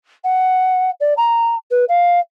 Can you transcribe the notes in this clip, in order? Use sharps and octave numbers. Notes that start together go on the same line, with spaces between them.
F#5
D5
A#5
B4
F5